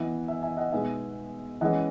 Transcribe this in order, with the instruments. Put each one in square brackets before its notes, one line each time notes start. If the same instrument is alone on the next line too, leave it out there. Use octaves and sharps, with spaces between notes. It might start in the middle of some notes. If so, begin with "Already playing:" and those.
Already playing: [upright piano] E3 B3 E4 D#5 F#5
E5 G#5
E5 G#5
D#5 F#5
B2 G#3 B3 D#4 E5 G#5
E3 G#3 C#4 D#5 F#5